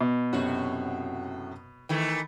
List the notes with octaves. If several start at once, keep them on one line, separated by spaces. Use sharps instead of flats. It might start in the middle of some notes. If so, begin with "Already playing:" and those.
B2
F#2 A2 C3 F#4
D#3 E3 A3